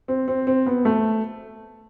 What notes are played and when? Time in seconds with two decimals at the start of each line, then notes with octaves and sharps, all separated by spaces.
0.08 C4
0.28 C4
0.47 C4
0.66 B3
0.85 A3